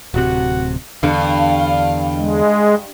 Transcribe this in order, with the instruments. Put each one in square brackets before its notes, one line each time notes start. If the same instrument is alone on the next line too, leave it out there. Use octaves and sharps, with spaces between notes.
[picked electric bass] D1 C3 [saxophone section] F#4
[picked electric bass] E2 D3 [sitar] G2 [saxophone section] F5
[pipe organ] G#3